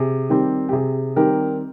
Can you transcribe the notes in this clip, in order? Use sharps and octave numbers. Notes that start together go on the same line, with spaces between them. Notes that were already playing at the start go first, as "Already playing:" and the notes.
Already playing: C3 G#4
D#3 G3 C4 G4
G4
C3 G#4
D#3 G3 C4 G4 A#4